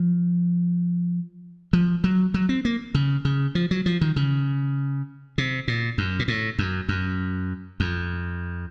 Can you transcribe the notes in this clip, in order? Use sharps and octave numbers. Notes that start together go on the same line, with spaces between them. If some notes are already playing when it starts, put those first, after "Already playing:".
Already playing: F3
F3
F#3
F#3
C4
A#3
C#3
C#3
F3
F#3
F3
D#3
C#3
C3
A#2
F#2
A#2
A2
F#2
F#2
F2